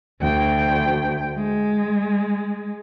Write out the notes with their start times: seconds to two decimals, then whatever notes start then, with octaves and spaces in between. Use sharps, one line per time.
0.21 D2 G5
1.37 G#3